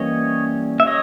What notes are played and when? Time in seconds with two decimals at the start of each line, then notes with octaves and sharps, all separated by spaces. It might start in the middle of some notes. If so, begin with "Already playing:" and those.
Already playing: E3 G3 A#3 C#4 C#5 D#5
0.80 E5
0.86 C#5 D#5